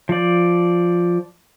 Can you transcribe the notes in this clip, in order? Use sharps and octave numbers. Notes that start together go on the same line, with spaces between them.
F3 D5